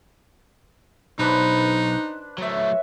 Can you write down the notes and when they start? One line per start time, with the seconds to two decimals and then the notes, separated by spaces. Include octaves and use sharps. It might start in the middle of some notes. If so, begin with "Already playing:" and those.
1.19 B1 D4 D#4 B4 C5
2.38 F#3 A3 C#5 E5